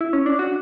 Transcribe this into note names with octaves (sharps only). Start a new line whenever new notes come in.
E4
C#4
D4
F#4